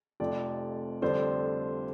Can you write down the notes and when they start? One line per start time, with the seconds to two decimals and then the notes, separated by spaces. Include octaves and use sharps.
0.20 F1 F2 C3 F3 D5
1.02 F2 D3 G3 C5